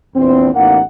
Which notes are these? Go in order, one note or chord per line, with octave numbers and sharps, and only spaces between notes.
A#1 E2 C4
A1 E2 A#3 D#4 F#5